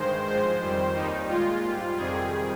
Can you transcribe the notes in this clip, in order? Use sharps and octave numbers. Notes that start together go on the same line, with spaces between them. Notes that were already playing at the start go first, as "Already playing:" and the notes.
Already playing: G2 D#3 G#3 C5
G#2 F3 G#3 C5
F2 D#3 G3
D#2 D#3 G3 D#4
A#2 G#3 F4
G#2 G3
F2 C3 D#3 G3 G#4